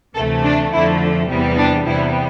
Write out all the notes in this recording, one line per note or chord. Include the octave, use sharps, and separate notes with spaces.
D2 C3 E3 A3 A4
D4
F2 D3 F3 A3 E4
E2 C3 E3 G3 B3
D4
E2 C3 G3 B3 E4